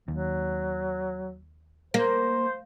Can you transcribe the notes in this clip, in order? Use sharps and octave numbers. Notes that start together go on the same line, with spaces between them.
D#2 F#3
A#3 C5